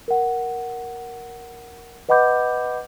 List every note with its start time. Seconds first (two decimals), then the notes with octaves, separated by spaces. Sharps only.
0.08 A#4 F#5
2.09 B4 D#5 F#5 B5 D6 G6